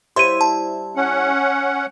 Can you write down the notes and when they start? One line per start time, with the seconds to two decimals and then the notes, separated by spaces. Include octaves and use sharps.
0.16 G3 E4 C5 C6 D#7
0.41 A5
0.96 C#4 F#5